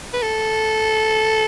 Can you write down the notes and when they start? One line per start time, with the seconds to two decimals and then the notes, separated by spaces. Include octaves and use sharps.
0.14 B4
0.22 A4